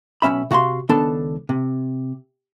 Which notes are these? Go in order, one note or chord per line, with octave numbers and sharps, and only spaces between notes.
B1 F3 C#4 E5 B5
C3 F#4 F5 A5 C6
C#2 D#3 B3 D4 A4 A5
C3